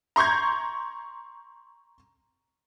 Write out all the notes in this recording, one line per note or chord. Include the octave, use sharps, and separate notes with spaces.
A#5 C6 C#6 G6 G#6